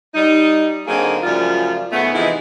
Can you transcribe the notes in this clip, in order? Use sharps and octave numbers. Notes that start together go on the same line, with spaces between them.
G3 D#4
D3 F#3 A#3 C4 D#4 G#4
F#2 C#3 F3 G3 A3 F4
G#2 C#3 A3 B3
C3 E3 F3 G#3 D#4 E4